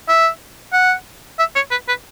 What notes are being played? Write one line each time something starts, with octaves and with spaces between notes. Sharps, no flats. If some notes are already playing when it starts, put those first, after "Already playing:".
E5
F#5
E5
C#5
B4
B4